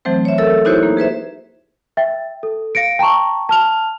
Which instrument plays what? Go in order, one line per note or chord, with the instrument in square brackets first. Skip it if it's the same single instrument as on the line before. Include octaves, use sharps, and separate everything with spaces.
[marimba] E3 F#3 A3 C4 C5
C#5 E5
A4 A#4 E5 E6
D#4 E4 F#4 G4 C5 C#5
A#3
G#4 B4 C5 E5
[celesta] E5 G5 A6
A4
F5 A#6 C#7 D7
G5 A5 A#5 C#6
A5 F6 F7